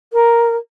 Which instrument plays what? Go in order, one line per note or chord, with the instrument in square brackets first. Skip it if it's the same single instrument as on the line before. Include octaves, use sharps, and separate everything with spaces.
[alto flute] A#4